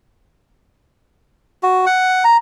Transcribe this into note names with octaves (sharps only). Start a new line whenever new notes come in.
F#4
F#5
A#5